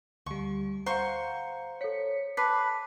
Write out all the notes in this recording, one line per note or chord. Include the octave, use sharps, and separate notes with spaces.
D2 G3 C#6
C5 F5 F#5 A#5 C#6 C#7
A4 C#5 B6 C#7
B4 A5 D6 B6 C7